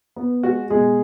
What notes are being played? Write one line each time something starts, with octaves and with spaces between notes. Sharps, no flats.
B3
G#3 F#4
B2 G#3 G#4